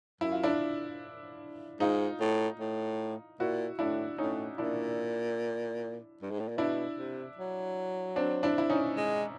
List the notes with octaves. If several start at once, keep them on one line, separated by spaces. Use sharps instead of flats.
F#2 E4
F4
D4 E4
G#2 D#4 F4
A2
A2
A#2 E4 F#4
A2 D4 E4
A2 C#4 D#4
A#2 D4 E4
G2
G#2
A2
A#2
B2 D4 E4
C3
F#3
C4 D4
D4 E4
E4
C#4 D#4
G#3